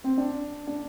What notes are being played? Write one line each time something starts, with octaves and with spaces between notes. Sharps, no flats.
C4
D4
D4